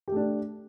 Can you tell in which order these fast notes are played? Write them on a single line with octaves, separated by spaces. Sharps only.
G4 A3 D4